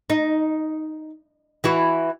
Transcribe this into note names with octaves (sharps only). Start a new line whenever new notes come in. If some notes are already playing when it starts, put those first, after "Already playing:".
D#4
E3 E4 F#4